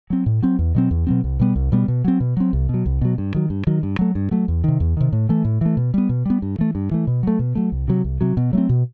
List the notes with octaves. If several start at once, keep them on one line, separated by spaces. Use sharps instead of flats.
F#3 C4
A2
F#3 C4
E2
B2 F#3 C4
E2
B2 F#3 C4
C2
B2 G3 B3
C2
B2 G3 B3
B2
F#3 C4
B2
F#3 C4
C2
B2 F#3
C2
B2 F#3
G2
D#3 F#3
G2
D#3 F#3
G2
F#3 A3
G2
F#3 A3
E2
C3 D#3
E2
C3 D#3
A2
E3 A3
A2
E3 A3
B2
G3 B3
B2
G3 B3
G2
E3 A3
G2
E3 A3
B2
F#3 A3
B2
F#3 A3
C2
C3 F#3
C2
C3 F#3
B2
F#3 A3 C4
B2